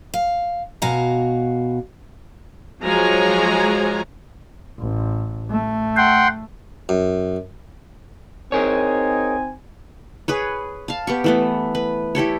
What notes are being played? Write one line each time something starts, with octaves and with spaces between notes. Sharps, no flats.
F5
B2 F#4 F5 G#5 A#5
F3 F#3 G#3 C#5 G#5 A#5
A1
A3
F#5 G5 C6
F#2
C4 D#4 G#4 A#4 C#5 G#5
G#4 B4 C#5
F5 A5
B3 G4 C#6
E3 A3 B3
B4
E4 G4 A4 C#5